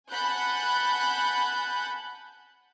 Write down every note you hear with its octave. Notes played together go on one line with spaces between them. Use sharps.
F#5 G#5 A5 B5 F#6 G6